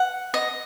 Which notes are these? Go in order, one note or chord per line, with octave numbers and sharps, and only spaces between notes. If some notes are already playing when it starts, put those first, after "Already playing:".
Already playing: F#5
D#5